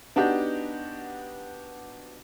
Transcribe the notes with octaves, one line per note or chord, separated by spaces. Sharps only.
B3 D4 D#4 F#4 G4